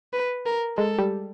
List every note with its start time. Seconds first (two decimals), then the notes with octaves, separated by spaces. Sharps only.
0.13 B4
0.46 A#4
0.78 G#3 A4
0.98 G3